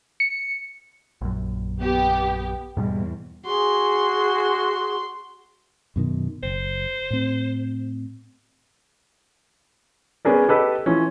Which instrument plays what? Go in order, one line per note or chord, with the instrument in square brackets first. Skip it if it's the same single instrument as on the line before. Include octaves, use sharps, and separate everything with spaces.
[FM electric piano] C#7
[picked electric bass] A#1 F#2
[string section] B3 G4
[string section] E2 [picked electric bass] G#2 B2 G3
[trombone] F#4 [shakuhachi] G#4 [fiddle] C6
[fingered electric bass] F#2 B2 D#3
[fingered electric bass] F#1 [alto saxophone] C5
[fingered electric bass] A2 C4
[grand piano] B3 C#4 G#4 A#4 D5
G4 A4 B4 D#5
E3 F3 C#4